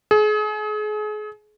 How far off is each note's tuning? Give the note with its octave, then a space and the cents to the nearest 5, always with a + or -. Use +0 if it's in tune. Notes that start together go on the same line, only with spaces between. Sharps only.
G#4 +35